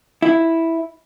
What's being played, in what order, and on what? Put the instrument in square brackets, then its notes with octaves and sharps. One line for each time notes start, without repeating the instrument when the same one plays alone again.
[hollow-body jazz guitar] E4